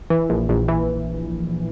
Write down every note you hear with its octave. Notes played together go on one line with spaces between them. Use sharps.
E3
A#1
A#1
E3